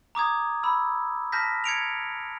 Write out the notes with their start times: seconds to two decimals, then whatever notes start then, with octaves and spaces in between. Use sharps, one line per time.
0.15 A#5 D6 D#6 G#6
0.63 B5 E6
1.32 A5 F6 G6 A#6 B6
1.64 G#6 C#7 D7 F7